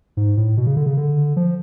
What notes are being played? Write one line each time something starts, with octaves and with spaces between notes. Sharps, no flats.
G#2
A2
B2
C#3
D3
C#3
D3
F3